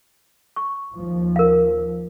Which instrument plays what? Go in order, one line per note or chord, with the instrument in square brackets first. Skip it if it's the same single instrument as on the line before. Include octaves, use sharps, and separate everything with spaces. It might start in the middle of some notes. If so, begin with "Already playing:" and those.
[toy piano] C#6
[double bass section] D#2 F3
[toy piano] A#4 F5